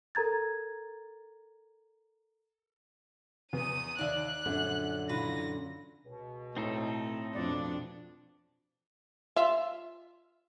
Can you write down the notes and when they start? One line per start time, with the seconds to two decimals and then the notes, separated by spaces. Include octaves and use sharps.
0.15 A4 A#4 A#5 G#6 A6
3.53 E2 B3 D#6 D#7
3.99 D#2 D#4 D5 E5 F#6
4.46 A#1 F#2 D3 C#4
5.09 A#2 E3 B4 A#6
6.05 C#2 B2
6.57 A2 A3 C4 D#4 A4
7.35 F2 B2 D4 D5
9.36 F4 E5